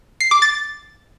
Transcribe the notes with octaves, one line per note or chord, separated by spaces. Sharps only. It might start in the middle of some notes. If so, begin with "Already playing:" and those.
C7
D6
A6